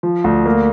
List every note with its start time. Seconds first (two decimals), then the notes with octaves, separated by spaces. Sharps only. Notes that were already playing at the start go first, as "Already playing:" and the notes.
0.03 F3
0.24 D2
0.46 A#3